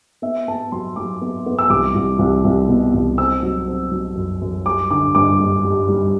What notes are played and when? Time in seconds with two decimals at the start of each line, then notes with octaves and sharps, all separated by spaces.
0.22 B3 E5
0.48 B3 A5
0.72 F#3 C6
0.96 F#3 D6
1.21 B3
1.46 B3
1.59 E6
1.70 C2 D6
1.95 C2
2.19 C2
2.45 C2
2.69 B2
2.94 C2
3.18 C4 E6
3.43 F#3
3.68 C4
3.91 F#3
4.16 F#2
4.42 F#2
4.65 G3 D6
4.91 D3 D6
5.15 G2 D6
5.40 G2
5.65 G3
5.89 G3